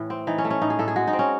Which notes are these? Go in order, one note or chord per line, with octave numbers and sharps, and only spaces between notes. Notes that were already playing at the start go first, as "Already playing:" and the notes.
Already playing: A2 E3
C4
E3 D#4
C#4
A3
C#4
A2 D#4
G#4
A2 A4
G#4
G#3 F#4
D#4
C4
C#4